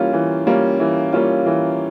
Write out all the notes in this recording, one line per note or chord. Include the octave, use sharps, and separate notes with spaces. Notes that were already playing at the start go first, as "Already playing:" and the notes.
Already playing: E3 G3 A#3 C#4 F4
E3
G3 A#3 C#4 F4
E3
G3 A#3 C#4 F4
E3